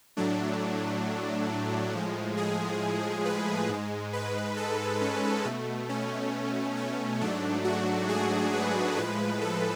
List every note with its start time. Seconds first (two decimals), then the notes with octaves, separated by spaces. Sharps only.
0.17 A2 F#3 A3 D4
1.93 A2 F3 G#3
2.37 G#4
3.25 B4
3.69 G#2 G#3
4.13 B4
4.57 A4
5.01 C#4
5.45 B2 A3
5.89 C#4
6.77 C#4
7.21 G#2 F#3 A3 D4
7.65 F#4
8.09 G#4
8.53 B4
8.97 A2 F3 G#3 B4
9.41 A4